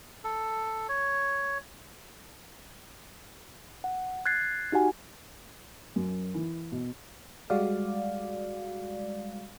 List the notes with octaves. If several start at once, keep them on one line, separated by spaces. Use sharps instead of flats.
A4
C#5
F#5
F#6 G#6 A6 C7
D#4 F#4 G4 F#5 G#5
F#2
E3
B2
G3 G#3 F#4 D5 F5